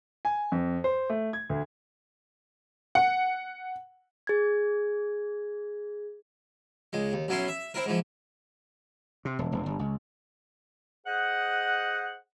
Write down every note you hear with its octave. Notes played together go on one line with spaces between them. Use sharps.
G#5
F2
C5
A3
G#6
D2
F#5
G#4 G#6
C#2 G#3
D#2
B1 F#3 C#4 E4 C6
E5
C4 E4 A#4
G#2 E3 F3
C3
E1
E1
G1
C#2
G#4 C5 D#5 F#5